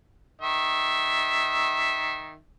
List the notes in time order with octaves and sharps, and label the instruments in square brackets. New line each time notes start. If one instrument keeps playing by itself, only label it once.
[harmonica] D#3 E5